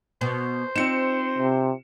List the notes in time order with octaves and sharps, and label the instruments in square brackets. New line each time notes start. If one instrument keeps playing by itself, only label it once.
[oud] B2 [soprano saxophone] C5
[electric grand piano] C4 C#7 E7 [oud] D#4 F4
[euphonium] C3